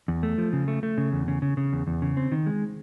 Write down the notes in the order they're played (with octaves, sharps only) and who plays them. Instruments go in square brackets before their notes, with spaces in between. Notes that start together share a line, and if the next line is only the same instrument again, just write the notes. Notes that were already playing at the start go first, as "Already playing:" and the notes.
[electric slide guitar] E2
A3
F3
C#3
A3
A3
C#3
E2
C#3
C#3
C#3
E2
E2
C#3
C4
D#3
G#3